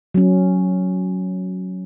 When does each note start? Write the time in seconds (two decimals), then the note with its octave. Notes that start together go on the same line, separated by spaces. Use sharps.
0.14 F#3 C#4